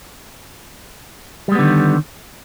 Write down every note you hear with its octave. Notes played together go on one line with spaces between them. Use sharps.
D3 D#3 G3 G#3 B3